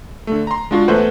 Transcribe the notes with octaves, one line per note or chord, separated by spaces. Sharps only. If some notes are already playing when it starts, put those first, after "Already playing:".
D3 A3
A#5 C6
G#3 D4 F4 F#4
E2 A3 B4 C5 F#5